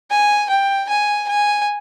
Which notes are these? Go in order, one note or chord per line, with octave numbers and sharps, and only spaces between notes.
G#5
G5
G#5
G#5